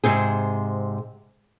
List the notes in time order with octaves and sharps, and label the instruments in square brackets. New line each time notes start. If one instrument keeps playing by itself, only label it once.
[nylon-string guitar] G#2 C3 C4 G#4